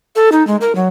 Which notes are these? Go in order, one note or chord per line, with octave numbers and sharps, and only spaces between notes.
A4
D#4
G#3
A#4
F#3